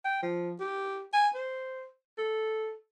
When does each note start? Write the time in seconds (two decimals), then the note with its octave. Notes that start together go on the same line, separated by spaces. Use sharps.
0.05 G5
0.23 F3
0.60 G4
1.13 G#5
1.35 C5
2.18 A4